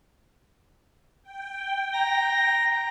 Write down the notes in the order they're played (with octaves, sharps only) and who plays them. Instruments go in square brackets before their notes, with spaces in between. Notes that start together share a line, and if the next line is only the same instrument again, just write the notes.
[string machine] G5
[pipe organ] A#5 A#6